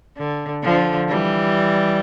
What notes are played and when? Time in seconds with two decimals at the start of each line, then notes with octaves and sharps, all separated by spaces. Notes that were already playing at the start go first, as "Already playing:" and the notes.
0.18 D3
0.64 D3 F3
1.09 E3 G3